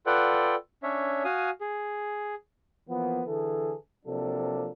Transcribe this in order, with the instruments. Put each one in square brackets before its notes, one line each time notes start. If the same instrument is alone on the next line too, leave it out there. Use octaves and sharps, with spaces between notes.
[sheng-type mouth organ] F4 A4 B4 D5 F#5 G5
C#4 D4 C#5 E5
F#4 F5 G#5 D#6
G#4
[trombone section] E3 F3 A#3 B3
D3 E3 G#4 A4
C3 F3 F#3 A#3 D4 A4